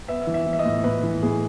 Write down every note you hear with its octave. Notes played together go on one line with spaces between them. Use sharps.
B3 E5
E3
E5
E3
E5
D#5
A2
A2 B4
E3
A2 G#4